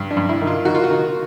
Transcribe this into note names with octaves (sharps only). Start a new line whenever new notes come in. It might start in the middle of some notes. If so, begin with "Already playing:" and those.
Already playing: G2
D4
G2
E4
D#3
F4
D#3 F#4
F4
F#4
D#3